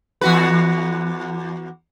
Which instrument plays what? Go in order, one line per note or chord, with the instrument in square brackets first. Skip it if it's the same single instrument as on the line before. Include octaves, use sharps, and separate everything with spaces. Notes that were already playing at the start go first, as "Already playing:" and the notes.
[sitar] E2 F#4 B4